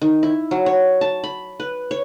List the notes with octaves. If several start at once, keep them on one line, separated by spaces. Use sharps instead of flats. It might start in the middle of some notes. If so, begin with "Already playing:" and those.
D#3
E4
F#3
C#5
A5
B5
B4
C#5